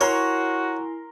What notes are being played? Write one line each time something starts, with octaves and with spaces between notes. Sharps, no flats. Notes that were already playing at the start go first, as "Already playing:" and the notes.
E4 F#4 A#4 C#5 G#5 A#5 C6